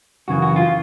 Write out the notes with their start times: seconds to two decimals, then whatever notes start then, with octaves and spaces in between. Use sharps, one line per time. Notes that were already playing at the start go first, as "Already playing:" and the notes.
0.28 F#2 C#3 E3 F#4
0.42 F#4
0.56 F4